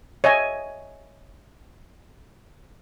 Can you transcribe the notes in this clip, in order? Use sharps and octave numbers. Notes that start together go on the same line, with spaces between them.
C#5 D#5 E5 G#5